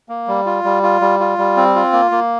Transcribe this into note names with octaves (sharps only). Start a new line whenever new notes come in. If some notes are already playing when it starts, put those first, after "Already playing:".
A#3
G3
F4
G3
F4
G3
F4
G3
C4
F4
A#3
A#3